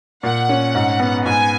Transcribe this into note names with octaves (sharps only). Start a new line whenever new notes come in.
A#2 F#5
C#4
G#2
B3
G#2 G#5